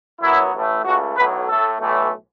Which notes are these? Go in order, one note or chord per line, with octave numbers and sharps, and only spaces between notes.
F#2 F#3 B3 E4
A1 A2 A3
C#2 C#3 A3 F#4
B1 A2 F#3 A3 B4
A2 A3 A4
B1 A2 E3 A3